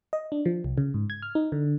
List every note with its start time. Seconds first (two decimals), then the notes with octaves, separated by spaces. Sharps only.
0.13 D#5
0.32 D4
0.46 F3
0.64 C2
0.78 C#3
0.94 G#2
1.10 G#6
1.22 F6
1.35 D#4
1.52 D3